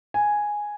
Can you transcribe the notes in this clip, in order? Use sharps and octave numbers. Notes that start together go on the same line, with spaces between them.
G#5